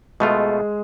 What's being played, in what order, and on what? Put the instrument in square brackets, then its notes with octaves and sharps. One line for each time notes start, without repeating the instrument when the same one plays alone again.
[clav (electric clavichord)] B2 A3 F4 [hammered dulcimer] G#3